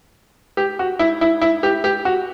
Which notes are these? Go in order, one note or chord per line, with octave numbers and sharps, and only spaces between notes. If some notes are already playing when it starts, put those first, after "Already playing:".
G4
F#4
E4
E4
E4
G4
G4
F#4